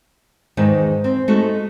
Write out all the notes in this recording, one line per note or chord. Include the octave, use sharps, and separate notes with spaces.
E2 G#2 D#3 A#4
C4
G#3 A3 D#4 F#4 A4